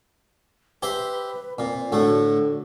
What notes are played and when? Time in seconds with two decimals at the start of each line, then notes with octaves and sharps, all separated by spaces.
0.83 G4 B4 C5 E5
1.58 A#2 C4
1.92 A2 D3 A3 F#4